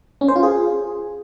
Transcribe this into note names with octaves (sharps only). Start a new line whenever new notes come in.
C#4
C5
F4
G#4